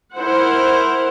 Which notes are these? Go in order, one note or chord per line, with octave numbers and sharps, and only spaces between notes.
E4 A#4 C5 F#5